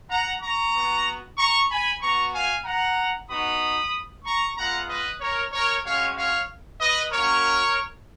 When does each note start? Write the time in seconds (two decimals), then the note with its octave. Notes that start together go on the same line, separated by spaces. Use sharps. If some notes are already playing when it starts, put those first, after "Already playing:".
0.10 F#5 A#5
0.41 A#5 C#6
0.74 B3 F#4
1.37 A#5 C#6
1.69 G#5 B5
2.01 B3 F#4 A#5 C#6
2.33 F5 G#5
2.65 F#5 A#5
3.29 B3 D#4 F#4 B5 D#6
4.25 A#5 C#6
4.57 G#3 B3 F4 F#5 A#5
4.88 B4 D#5
5.21 A#4 C#5
5.53 A#4 C#5
5.85 G#3 C#4 F#4 C#5 F5
6.16 C#5 F5
6.81 B4 D#5
7.12 A#3 C#4 F#4 A#4 C#5